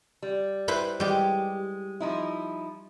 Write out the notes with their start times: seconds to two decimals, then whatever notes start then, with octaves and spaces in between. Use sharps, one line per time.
0.22 G3
0.68 E4 B4 C5
1.00 G3 G#3 G4
2.00 F3 D#4 E4